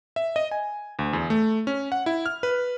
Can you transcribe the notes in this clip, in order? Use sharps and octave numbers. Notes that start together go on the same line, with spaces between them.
E5
D#5
G#5
D2
E2
A3
C#4
F#5
E4
F6
B4